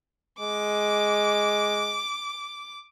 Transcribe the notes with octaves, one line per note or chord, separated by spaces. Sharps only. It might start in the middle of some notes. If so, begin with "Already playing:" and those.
G#3 D6